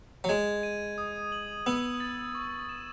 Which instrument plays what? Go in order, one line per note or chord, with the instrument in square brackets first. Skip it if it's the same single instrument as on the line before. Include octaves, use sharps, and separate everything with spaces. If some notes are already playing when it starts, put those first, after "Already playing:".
[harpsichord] F#3
[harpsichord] G#3 [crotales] G#6
[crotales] D#7
D#6
F#7
[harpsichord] B3 [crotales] E6
[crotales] A6
C#6
E7